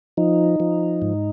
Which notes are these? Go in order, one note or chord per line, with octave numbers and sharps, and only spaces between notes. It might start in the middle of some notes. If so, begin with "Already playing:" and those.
F3 D#4
F3
G#2